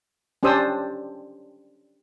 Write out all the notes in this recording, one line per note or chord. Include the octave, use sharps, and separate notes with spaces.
C#4 D4 G4 C5 D#6 E6